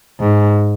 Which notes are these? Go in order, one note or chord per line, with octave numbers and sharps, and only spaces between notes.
G#2